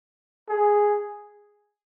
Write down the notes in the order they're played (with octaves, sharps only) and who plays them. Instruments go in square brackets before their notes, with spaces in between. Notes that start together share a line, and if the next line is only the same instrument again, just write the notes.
[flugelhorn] G#4